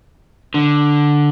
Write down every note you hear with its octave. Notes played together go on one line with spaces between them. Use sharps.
D3